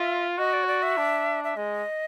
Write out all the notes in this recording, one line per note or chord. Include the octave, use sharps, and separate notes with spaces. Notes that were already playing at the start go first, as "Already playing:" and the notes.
Already playing: F4 E5
F#4 D#5
D5
C#5
D5
E5
D4
E5
G#3 D#5